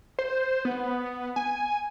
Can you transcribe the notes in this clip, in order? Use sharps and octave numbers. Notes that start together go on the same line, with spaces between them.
C5
B3
G#5